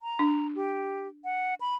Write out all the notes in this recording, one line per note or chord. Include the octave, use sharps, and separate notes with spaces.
A#5
D4
G4
F#5
B5